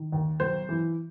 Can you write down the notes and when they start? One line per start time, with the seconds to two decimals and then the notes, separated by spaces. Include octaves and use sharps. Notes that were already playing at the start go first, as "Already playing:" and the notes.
Already playing: D#3
0.12 D#2
0.40 B1 C5
0.69 E3